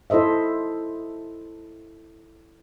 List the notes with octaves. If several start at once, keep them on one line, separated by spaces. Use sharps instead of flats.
E4 A4 C5 D#5 E5